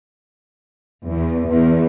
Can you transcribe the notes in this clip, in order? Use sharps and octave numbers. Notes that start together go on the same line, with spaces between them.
E2
E2